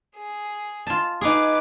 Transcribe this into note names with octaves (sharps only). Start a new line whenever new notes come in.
G#4
F4 A5
D#4 G#4 B4 D6 A6